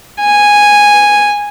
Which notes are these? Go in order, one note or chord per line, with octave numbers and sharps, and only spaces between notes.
G#5